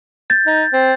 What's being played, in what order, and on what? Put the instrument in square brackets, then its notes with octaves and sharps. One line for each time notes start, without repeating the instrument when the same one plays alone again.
[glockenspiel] G6 A6
[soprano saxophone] D#4
C4